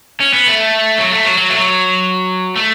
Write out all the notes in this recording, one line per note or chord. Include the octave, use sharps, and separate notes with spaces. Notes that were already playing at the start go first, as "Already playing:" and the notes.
C#4
B3
A3
F#3
A3
F#3
F#3
A3
F#3
A3